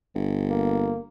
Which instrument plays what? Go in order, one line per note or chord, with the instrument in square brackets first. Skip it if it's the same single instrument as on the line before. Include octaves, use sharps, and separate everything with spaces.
[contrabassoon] G1
[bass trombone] A#3